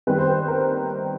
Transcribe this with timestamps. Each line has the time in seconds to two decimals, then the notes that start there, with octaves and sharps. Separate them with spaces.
0.07 D#3 G3 C4 B4
0.19 C5
0.30 B4
0.48 A#4